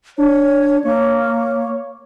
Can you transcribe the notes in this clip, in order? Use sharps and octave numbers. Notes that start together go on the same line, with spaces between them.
D4 C#5
A#3 C#5